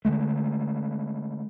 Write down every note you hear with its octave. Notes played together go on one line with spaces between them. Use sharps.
D3 D#3 G#3 A3